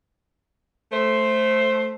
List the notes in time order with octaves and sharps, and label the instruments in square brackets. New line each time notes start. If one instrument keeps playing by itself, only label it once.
[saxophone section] A3 C5